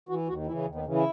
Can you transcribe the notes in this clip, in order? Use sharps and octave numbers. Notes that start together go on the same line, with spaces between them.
E3 F#4
D#2 F#4
C#3 E3 E4
D#2
B3
C#3 E3
E4